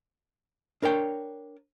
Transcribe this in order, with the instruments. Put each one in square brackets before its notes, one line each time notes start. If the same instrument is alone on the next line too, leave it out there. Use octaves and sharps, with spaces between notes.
[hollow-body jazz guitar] D4 A#4 C#5 G5